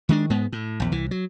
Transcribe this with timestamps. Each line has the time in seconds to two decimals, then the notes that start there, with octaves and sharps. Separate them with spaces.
0.09 D#3 G#3 D4
0.30 G#2 G#3 B3
0.52 A2
0.80 A#1 E2
0.92 C2 E3
1.11 F#3